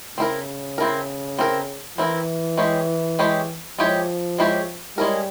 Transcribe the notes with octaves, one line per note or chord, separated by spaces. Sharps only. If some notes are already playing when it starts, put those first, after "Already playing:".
C#3 C4 E4 A#4
C4 E4 A#4
C4 E4 A#4
E3 C4 E4 A#4
G#3 E4 G4 C#5
G#3 E4 G4 C#5
F3 G#3 E4 G4 C#5
G#3 E4 G4 C#5
G3 G#3 C#4 E4 A#4